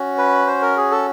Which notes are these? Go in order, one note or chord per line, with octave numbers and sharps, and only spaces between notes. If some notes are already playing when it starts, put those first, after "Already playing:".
Already playing: C#4 F#4
B4
C5
A#4
G#4
A4